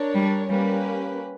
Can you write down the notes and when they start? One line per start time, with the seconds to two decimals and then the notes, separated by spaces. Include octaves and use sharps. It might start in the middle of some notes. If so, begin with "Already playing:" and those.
Already playing: D4 A#4 C#5
0.14 G3
0.49 G3 A#3 C#4 G4 B4